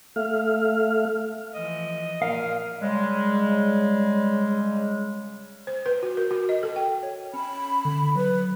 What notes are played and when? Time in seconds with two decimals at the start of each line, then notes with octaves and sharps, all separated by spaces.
0.16 A3 A4 E5 F5 F6
1.54 E3 F3 D#5
2.22 A#2 A#4 F5
2.81 C#3 G3 G#3
5.67 C5
5.86 B4
6.03 F#4
6.17 A#4
6.31 F#4
6.49 D#5
6.63 A4
6.76 G5
7.03 C#5
7.34 C#4 B5
7.85 D3
8.16 F#3 B4